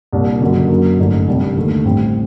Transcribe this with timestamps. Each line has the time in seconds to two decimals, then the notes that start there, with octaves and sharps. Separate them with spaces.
0.13 C2 A#2 G3 D4
0.41 F#1 F#2 D3 F#3
0.69 F#2 F#3 A#3
0.98 A1 G2 D3 A3 D#4
1.28 C2 C3 G3 D4
1.56 D#2 D3 A3
1.85 A1 A2 G3 C4